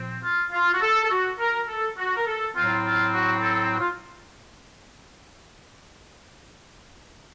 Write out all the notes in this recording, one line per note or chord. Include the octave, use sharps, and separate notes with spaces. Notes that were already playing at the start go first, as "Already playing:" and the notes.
Already playing: A#2 F3 C4
F4
F4
F#4
A4
A4
F#4
A#4
A4
F#4
A#4
A4
A2 F#3 C4 F4
F4
F#4
A4
F#4
F4